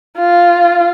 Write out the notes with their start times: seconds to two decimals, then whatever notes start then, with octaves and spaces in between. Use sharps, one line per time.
0.18 F4